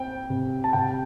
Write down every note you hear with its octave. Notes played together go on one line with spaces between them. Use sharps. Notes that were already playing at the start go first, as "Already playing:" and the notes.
Already playing: C4 G5
C3
A5
C3 G5